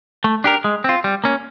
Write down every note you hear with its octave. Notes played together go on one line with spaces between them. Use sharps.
A3
D4 G4 A#4
G#3
C4 F4
G3
A#3 C#4